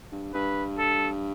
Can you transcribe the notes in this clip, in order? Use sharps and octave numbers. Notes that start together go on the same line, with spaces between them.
G2
G2 B4
A4